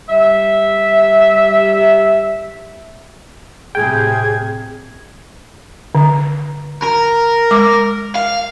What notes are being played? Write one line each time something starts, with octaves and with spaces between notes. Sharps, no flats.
G3 E5
A2 C3 G#4 G5 G#6
D3
A#4
G#3 D6
F5